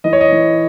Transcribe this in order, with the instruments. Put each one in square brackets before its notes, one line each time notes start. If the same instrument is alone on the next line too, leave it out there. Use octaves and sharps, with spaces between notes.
[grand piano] E3 D#5
C#5
D#5
E3